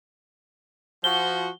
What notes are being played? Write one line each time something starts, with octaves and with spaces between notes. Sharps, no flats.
F3 F#4 G7